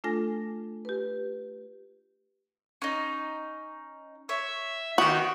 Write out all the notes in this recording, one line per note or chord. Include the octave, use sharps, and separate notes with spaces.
A3 D4 F4 A4 G#5 A#6
G4 B4
C#4 D#4
C#5 E5
D#3 B3 F#4 G4 C#6